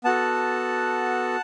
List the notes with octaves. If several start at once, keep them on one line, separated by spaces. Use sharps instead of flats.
B3 F#4 A4 F#5 A5